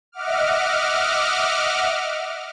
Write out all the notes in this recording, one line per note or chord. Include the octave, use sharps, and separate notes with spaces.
D#5 E5 F#5 D6 F6